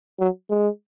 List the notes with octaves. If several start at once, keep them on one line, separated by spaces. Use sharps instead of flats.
F#3
G#3